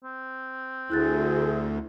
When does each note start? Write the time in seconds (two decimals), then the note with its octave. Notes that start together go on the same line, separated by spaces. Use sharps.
0.04 C4
0.90 D2 E4 G#4 F#6 A6